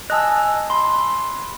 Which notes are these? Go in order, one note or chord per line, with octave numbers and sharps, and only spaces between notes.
D#5 G#5 A5 D#6 E6 F#6
B5 C6